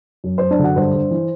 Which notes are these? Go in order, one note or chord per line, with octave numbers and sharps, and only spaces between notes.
F#2
F#2 C5
D4 D5
D3 F#4 F#5
G2 C5
G2
E3